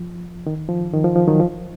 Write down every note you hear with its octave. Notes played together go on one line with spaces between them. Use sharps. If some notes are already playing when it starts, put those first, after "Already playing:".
Already playing: F3
D#3
F3
D#3
F3
F3
D#3 F#3
F3